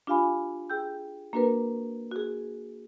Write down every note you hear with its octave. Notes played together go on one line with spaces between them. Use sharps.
D4 F4 G4 F5 G#5 B5
G#4 G5 E6 G6
A#3 D4 F#4 A#4 B4
F#4 G#4